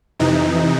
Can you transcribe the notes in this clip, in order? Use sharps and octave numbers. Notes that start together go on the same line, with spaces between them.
F2 C3 E3 D#4